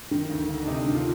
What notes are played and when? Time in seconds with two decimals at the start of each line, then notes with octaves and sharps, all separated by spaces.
0.11 D#3
0.30 D2
0.49 D2
0.63 D4
0.67 C3 D#4
0.85 D#3
0.94 F4